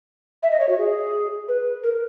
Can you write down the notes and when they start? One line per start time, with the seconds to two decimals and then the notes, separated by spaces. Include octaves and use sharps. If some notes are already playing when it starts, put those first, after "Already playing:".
0.43 E5
0.51 D#5
0.60 C#5
0.69 F#4
0.78 G#4
1.48 B4
1.83 A#4